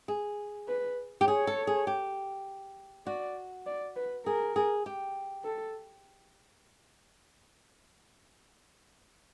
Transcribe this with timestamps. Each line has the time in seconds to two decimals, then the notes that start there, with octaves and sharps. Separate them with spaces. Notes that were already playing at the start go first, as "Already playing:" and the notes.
0.08 G#4
0.68 B4
1.21 G4
1.28 G#4 C#5
1.47 A4
1.67 G#4
1.87 G4
3.06 F#4 D5
3.66 D5
3.96 B4
4.26 G#4 A#4
4.56 G#4
4.86 G4
5.45 A4